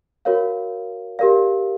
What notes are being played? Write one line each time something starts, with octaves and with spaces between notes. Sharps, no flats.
F#4 A#4 C#5 F5
G4 A#4 D5 F5